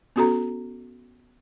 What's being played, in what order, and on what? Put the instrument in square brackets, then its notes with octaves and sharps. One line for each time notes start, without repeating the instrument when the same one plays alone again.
[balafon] B3 C#4 F#4 A4 A#5